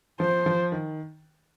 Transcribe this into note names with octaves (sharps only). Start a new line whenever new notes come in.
F3 C5
F3
D#3